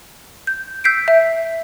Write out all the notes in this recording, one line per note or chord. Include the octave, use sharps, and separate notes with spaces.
G6
E6 G6 B6 C7 D7
E5